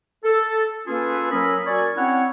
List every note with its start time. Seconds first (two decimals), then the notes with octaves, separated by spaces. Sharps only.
0.25 A4
0.87 A#3 C#4 F4 G#4 A4 B4
1.31 F#3 C#4 A#4 B5 D#6 E6
1.67 F#4 A#4 D5 G#5 C#6
1.96 C4 C#4 E4 C#5 F#5